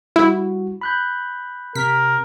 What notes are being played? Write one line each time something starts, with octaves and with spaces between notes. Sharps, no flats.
G3 E4 F#4
B5 F#6 G6
C3 A#4 B6